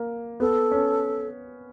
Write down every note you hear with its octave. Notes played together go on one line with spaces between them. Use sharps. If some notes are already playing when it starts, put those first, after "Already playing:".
Already playing: A#3
B3 A4
C#4